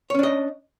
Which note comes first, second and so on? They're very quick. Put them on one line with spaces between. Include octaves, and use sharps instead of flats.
C#5 C#4 D4 D#5